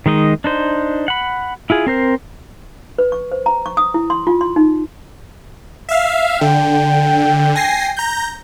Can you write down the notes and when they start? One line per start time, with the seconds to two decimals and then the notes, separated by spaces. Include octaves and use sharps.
0.06 D#3 G#3 D#4 D#5
0.44 D4 D#4 C5
1.08 F#5 B5
1.70 E4 F4 G#4
1.87 C4 A#4 C5
2.98 B4
3.12 C#6
3.32 C5
3.46 A#5
3.66 C#6
3.77 D#6
3.94 E4
4.10 C6
4.27 F4
4.41 C6
4.56 D#4
5.89 E5 F5
6.41 D3 G5
7.55 G#5 A#6 C7
7.97 A#5 G6